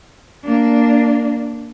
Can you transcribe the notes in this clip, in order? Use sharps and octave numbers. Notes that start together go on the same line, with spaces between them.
A#3 D4